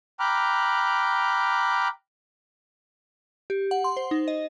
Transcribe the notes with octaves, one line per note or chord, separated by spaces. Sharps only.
G5 A#5 B5 D6 F6 F#6
G4
F#5
C6
C5
D#4
D#5